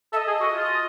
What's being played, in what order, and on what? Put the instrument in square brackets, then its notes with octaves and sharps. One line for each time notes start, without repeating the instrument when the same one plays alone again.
[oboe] A4 [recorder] E5
[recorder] D#5
[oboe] G#4
F#4
F4